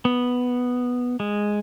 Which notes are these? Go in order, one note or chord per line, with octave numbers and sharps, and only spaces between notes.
B3
G#3